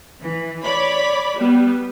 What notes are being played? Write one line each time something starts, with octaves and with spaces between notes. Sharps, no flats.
E3
C#5 D5 B5
G3 B3